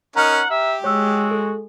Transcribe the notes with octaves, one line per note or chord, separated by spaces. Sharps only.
C#4 D#4 A#4 F#5 A#5 F6
G4 E5
G#3 F#4 C#5 E6
A4